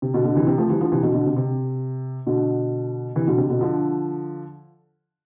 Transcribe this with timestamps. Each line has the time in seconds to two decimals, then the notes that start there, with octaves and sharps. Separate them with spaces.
0.02 C3
0.14 B2 D3
0.25 B2 D3
0.36 C3 E3
0.47 C3
0.58 F3 A3
0.70 E3 G3
0.81 D3 F3
0.92 C3 E3
1.03 B2 D3
1.14 B2 D3
1.26 C3
1.36 C3
2.26 B2 D3
3.16 C3 E3
3.27 B2 D3
3.38 C3
3.49 B2 D3
3.61 D3 F3